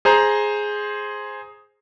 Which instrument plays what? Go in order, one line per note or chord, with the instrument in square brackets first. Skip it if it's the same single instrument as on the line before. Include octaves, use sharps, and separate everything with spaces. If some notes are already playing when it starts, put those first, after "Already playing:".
[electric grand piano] G#4 C5 A#5